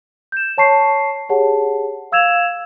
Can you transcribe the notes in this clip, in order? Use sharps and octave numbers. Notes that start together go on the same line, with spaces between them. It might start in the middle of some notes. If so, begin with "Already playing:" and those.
G6 E7
C#5 A5 C#6 C7
G4 G#4 C#5 F#5 A5
F5 E6 G#6 E7 F7